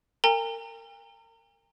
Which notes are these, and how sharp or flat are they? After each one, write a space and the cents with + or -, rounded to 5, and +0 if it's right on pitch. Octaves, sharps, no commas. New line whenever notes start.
A#4 -35 G5 +45 A#5 -35